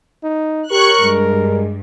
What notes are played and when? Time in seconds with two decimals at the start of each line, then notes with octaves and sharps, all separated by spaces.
0.23 D#4
0.71 G4 A#4 C#5 C#6 F#6
1.03 G2 G#3